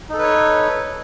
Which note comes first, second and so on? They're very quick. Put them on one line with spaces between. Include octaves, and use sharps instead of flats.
D#4 A4 B4 C#5